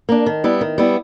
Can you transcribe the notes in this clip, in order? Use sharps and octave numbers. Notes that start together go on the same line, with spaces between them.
A#3 D4
D#3
G3 B3 E4
D#3
G3 B3 E4